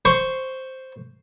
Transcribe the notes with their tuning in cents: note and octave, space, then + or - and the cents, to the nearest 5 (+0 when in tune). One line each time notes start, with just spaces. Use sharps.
C5 +0 C#6 +0